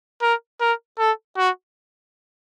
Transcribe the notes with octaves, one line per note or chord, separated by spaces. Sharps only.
A#4
A#4
A4
F#4